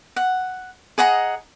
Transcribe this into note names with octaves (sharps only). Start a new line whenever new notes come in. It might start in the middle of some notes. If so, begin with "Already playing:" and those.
F#5
G#4 D#5 F#5 A#5